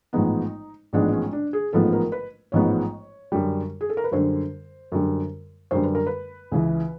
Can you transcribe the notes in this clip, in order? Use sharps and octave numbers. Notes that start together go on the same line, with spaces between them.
A1 G#2 F3 G#3 B3 D#4
A1 G#2 F3 G#3 B3 D4
C#4
D4
G#4
A1 G#2 F3 G#3 B3 A4
A#4
B4
A1 G#2 F3 G#3 B3 C#5
F#2 D3 G3
G#4
A4
A#4
B4
F#2 D3 G3 C5
F#2 D3 G3
F#2 D3 G3 C5
B4
A#4
B4
C#2 C#3 E3